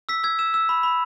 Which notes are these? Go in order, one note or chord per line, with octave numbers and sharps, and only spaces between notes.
E6 B6
E6 G#6
E6 E7
E6
B5
B5